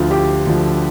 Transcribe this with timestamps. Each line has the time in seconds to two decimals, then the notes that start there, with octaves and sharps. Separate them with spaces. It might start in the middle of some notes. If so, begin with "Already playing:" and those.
Already playing: D2 D3 F3 F4
0.11 G4
0.47 D2 D3 F3